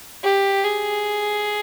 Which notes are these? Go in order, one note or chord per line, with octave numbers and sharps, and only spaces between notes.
G4
G#4